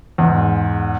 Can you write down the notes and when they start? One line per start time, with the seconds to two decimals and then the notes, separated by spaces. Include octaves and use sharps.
0.18 E2 G#2